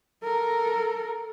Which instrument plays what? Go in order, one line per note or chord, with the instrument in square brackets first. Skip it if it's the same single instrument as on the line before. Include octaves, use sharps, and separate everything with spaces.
[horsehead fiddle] A4 A#4